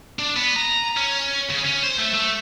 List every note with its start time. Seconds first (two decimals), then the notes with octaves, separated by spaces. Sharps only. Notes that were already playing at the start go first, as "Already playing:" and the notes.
0.19 D4
0.36 B3
0.56 A#5
0.97 C#4
1.49 C#3
1.65 C#4
1.83 C5
1.99 A3
2.14 A3